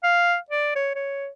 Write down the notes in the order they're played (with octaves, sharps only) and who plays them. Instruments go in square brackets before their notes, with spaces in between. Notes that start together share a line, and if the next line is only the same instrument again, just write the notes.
[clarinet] F5
D5
C#5
C#5